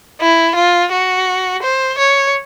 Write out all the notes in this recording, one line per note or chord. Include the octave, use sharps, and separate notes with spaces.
E4
F4
F#4
C5
C#5